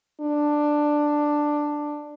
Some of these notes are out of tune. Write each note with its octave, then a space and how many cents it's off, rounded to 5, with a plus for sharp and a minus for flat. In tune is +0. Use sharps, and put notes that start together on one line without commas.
D4 +10